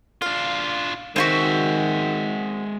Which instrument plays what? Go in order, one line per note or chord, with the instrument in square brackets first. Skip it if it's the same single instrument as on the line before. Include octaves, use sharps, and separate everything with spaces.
[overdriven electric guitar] D4 F4 [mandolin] F5
[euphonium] D#3 [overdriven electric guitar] G#3 E5 [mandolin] C4 F4 F#4